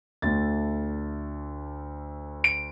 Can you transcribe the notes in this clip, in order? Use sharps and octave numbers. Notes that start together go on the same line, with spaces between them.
D2 D3 A3 A6
D7